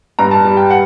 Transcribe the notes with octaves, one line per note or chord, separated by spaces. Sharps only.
G2 A#5
A5
G3
G5
F#5